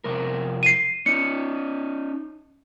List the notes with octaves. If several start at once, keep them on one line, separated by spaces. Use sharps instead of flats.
F2 C3 A#4
C7 D#7
C#4 D#4 C#7